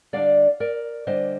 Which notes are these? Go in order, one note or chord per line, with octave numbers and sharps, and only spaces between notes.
D3 G3 D4 D5 F5
A#4 D5
D3 G3 D4 C5 D#5